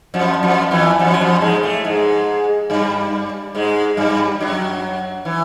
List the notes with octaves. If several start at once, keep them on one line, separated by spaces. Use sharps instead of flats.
F2 F3
F2 F3
E2 E3
F2 F3
F#3
F2 F3
G#2 G#3
A2 A3
G#2 G#3
G2 G3
G#2 G#3
G2 G3
F#2 F#3
E3